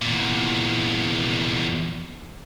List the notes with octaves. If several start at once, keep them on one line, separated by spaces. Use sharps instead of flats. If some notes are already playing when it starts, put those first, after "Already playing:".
E2 A#2